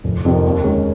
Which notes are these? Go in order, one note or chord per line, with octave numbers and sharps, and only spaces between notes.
F1
F2 C3 D#3
D#2
D#3 G#3 C#4